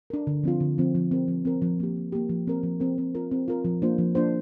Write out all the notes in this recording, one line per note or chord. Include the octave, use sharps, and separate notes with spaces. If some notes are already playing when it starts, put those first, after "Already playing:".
D4 A#4
D3
F3 C4 F4
D3
F3 C4 F4
F3
C4 A#4
F3
C4 A#4
F3
A#3 G4
F3
A#3 G4
F3
C4 A#4
F3
C4 A#4
C4
F4 A#4
C4
F4 A#4
F3
A#3 D4 F4 C5
F3
A#3 D4 F4 C5